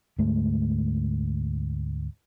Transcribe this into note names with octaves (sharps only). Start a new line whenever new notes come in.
D2 G#2 G#3 A3